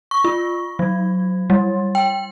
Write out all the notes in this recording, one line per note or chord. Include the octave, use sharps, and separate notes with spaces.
C#6
F4
F#3
G3
G5